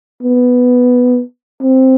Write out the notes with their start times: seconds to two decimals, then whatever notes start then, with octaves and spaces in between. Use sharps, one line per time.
0.22 B3
1.62 C4